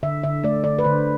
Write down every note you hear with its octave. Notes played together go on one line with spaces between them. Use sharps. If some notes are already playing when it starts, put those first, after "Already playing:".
D3 E5
D3 E5
A3 D5
D3 D5
B4
D3 C5